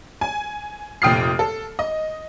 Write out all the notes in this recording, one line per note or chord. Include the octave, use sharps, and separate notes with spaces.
G#5
F1 A#2 G5 D#6 F6 C7
A4
D#5